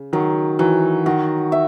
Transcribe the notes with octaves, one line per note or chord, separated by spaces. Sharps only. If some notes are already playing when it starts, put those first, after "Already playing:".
Already playing: C#3
D#3 F#3
E3 F#3
D#3 F#4
E5